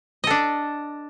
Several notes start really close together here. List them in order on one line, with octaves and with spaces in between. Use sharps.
D#5 A4 D4